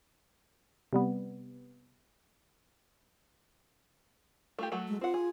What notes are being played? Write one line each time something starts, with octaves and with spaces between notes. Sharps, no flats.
C3 G3 B3
A3 F4 G4
F#3 A3 F#4
G#3
C4 F4 F#5
G#4